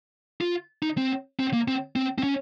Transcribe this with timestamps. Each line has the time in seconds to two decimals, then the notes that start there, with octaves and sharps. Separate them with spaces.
0.41 F4
0.83 D#4
0.97 C4
1.40 C4
1.53 A#3
1.68 C4
1.96 C4
2.18 C4
2.23 C#4